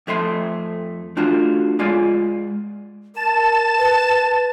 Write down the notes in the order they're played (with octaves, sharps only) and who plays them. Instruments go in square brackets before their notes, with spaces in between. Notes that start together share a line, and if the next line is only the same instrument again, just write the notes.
[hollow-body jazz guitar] F2 A3 E5 C6
A3 D4 F4 F#4
G#3 F4 D5 G#5
[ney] A#4 [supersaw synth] A5 E7
[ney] B4